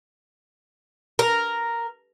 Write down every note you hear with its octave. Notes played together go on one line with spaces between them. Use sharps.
A#4